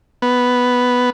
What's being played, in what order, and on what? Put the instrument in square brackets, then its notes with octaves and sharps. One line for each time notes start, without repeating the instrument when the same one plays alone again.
[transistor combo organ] B3